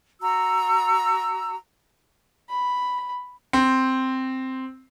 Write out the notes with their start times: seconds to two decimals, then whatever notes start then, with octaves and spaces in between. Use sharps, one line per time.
0.20 F#4 A#5 E6
2.50 B5
3.53 C4